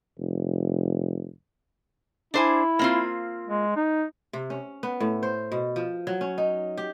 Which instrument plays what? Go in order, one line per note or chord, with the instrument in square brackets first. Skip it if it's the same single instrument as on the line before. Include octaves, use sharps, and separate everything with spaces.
[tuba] F1
[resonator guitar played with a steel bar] D4 C5 G#5 [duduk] E4
[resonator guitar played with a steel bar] A#3 C4 F4
[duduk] G#3
D#4
[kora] C3
C#4
B3
A2
C5
B2
F3
F#3
C#4
D#4
G4